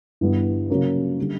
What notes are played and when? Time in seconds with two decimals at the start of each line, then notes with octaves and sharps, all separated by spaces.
0.21 G1 G2 E3 G3 B3
0.70 C#3 F#3 A#3 C#4
1.19 D3 G3